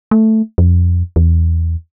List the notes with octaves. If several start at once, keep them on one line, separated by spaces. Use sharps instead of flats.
A3
F2
E2